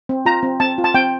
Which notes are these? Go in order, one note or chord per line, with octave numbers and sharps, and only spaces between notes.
C4
F4 A#5
C4
C4 A5
F4
A5
C4 G5